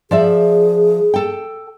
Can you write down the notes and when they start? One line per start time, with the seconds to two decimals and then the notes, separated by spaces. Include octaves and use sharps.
0.11 F3 G#4 D5 E5
1.14 A4 G5